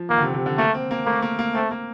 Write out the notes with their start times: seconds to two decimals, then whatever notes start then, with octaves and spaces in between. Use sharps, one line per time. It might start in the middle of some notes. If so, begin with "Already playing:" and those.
Already playing: F3
0.10 D#3 A#3
0.18 D3
0.22 C3
0.34 C3
0.46 D3
0.58 A3 A#3
0.74 C4
0.91 A#3
1.06 A3 A#3
1.22 A#3
1.39 A#3
1.55 A3 C4
1.71 A#3